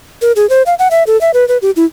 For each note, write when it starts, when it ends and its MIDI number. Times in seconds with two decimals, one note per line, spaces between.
0.22 0.32 70
0.36 0.48 68
0.50 0.63 72
0.66 0.74 77
0.79 0.88 78
0.91 1.03 76
1.07 1.19 69
1.21 1.31 76
1.34 1.47 71
1.48 1.58 71
1.62 1.71 67
1.76 1.85 64